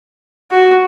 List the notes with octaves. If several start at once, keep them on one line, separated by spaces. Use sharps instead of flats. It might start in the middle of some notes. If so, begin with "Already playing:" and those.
F#4